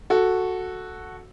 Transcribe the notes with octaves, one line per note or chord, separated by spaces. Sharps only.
F#4 A4